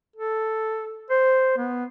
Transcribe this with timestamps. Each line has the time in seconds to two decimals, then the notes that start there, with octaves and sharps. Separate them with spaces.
0.16 A4
1.10 C5
1.57 B3